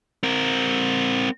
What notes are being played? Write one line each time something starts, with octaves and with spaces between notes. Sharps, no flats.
C4 A#4